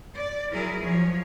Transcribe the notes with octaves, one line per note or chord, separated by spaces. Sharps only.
D5
F#3 E4 G#4 A#4
F3 F#3 C#5